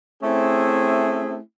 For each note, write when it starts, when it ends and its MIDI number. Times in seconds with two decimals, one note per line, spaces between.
0.23 1.37 57
0.23 1.37 60
0.23 1.37 61
0.23 1.37 64
0.23 1.37 68